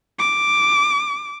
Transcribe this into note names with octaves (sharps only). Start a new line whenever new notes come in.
D6